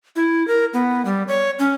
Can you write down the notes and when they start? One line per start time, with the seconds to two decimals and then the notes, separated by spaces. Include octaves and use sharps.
0.16 E4
0.48 A#4
0.74 B3
1.05 G3
1.28 C#5
1.59 C#4